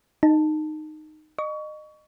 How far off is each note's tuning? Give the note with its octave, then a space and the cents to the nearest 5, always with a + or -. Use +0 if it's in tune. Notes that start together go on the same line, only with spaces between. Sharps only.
D#4 -15 A5 +0
D#5 -30 C#6 +25